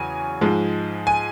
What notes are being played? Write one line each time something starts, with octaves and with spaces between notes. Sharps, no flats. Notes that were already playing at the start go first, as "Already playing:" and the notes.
Already playing: E2 C#3 F#3 G#5
G#2 F3 G#3
G#5